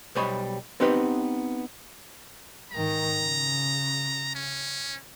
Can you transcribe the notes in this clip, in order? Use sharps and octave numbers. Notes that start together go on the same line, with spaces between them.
B1 G3 C5 C#5 D#5 B5
B3 C4 D#4 G4 B4
G#2 D#3 A#5
C#3
C#4